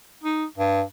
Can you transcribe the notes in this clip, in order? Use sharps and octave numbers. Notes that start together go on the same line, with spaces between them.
D#4
G2